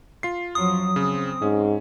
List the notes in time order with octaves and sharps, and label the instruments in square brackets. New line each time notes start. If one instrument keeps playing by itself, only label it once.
[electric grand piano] F4 C7
[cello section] F#2 F3 F#3 [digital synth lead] D#6
[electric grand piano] C#3 [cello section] C4
[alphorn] G#2 [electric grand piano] C#4